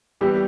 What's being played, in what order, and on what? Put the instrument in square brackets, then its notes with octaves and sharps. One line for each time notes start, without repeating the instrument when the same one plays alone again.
[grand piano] A2 E3 B3 [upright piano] G3 G4